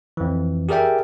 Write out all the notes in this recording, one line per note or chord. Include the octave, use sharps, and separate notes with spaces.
F2 E3
G4 G#4 A#4 D5 E5 G5